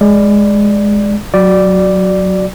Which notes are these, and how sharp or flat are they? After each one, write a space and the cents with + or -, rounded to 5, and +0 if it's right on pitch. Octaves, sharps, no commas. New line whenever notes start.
G#3 +0 D5 +0
F#3 +0 F#4 +0 D5 +0